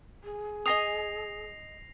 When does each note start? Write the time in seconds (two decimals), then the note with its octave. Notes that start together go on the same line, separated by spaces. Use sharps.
0.24 G#4
0.66 D#5 G#5 D#6 A#6 C7 F7